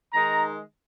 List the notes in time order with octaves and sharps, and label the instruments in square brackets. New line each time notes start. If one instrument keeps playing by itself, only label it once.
[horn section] D#3 G#3 D#4 A#5